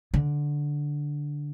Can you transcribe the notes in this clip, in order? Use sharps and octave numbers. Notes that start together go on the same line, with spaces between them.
D3